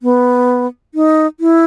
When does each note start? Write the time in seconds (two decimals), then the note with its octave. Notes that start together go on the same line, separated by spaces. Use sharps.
0.03 B3
0.94 D#4
1.40 E4